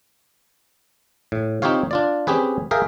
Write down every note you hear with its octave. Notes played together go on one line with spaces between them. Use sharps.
A2
C4 D#4 F4 G4 C#5 F5
D4 F4 D5
C4 C#4 G4 G#4 B4
G#4 A#4 E5 F5 G5